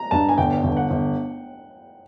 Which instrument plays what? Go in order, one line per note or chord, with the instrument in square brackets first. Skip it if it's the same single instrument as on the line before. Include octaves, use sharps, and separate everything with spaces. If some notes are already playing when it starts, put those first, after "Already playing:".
Already playing: [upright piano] A#5
[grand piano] G2 [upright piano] A5
[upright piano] G#5
[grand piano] G1 [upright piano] G5
[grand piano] G1
[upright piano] F#5
[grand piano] G1